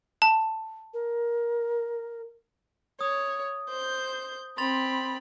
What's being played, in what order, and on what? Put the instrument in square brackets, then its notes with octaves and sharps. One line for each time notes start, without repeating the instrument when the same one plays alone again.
[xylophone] A5
[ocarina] A#4
[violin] C#5 [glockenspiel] D#6
[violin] C5 G6
[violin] C4 B5 [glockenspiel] C6 A6 F7